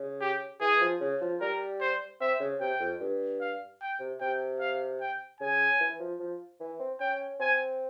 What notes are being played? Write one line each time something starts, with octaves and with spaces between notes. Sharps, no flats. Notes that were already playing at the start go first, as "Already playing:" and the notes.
Already playing: C#3
G4
E3 G#4
F3
C#3
F3
G3 A#4
C5
C4 E5
C#3
C3 G5
F2
G2
F5
G5
C3
C3 G5
F5
G5
C#3 G#5
E3
F3
F3
E3
C4
C#4 G5
C4 G#5